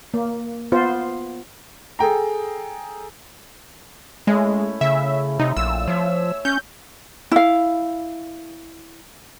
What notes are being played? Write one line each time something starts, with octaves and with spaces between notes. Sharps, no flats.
A#3
B3 F4 C5
G#4 A4 G5 A#5
G#3 A3 C#4 E4
C#3 E5
C3 D#4
A#1 F4 E6
F3 C#5 E5
C#4 G6
E4 F5